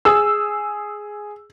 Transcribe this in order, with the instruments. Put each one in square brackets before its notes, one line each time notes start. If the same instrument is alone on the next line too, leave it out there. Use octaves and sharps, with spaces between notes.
[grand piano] G#4 [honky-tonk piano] E6